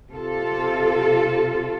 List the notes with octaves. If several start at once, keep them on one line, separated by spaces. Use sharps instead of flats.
C3 F4 A4